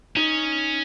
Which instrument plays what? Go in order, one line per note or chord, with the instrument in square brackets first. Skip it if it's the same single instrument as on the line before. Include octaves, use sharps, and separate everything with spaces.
[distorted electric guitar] C#4 [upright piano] D#4